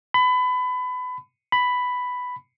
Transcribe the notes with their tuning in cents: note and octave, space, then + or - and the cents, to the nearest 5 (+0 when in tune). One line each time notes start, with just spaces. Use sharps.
B5 +25
B5 +5